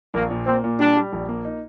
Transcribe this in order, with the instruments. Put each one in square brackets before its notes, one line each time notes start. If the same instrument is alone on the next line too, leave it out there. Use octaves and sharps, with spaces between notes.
[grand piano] A#1 [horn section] A#3
[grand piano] A#2
[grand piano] A#3 [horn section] C4
[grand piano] A#2
[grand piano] G3 [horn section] D4
[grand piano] G3
A#1
A#3
D#4